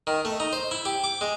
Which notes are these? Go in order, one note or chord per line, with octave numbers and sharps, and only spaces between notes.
D#3
A3
D#4
C5
E4
G4
D6
G#3